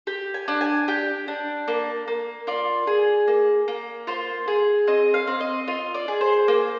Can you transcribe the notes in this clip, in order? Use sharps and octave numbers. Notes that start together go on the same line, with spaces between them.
G4
G#5
D4
G#5
G4 G5
D4
A#3
A#3
F4 D5
G#4
A#3
A#3
F4 C5
G#4
C4 D#5
F5
C4
D#5
F4 D#5
D5
G#4
C5
A#3